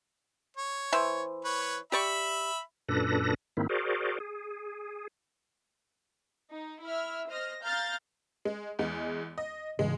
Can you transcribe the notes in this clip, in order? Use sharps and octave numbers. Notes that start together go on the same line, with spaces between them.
C#5
E3 C5 E5
B4 C#5
G4 D5 E5 B5 C#6
F#2 A#2 D4 A4 B4 A#6
G#2 D#3 A#3 C4 E4
F#4 G#4 A#4 C5 D5
G#4
D#4
E4 E5 F6
C5 D#5 F6 A#6
F5 A#5 F6 G6 A6
G#3
E2 G#3
D#5
G#2 C#3 E3 G#3